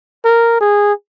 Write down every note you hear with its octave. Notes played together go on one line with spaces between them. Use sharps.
A#4
G#4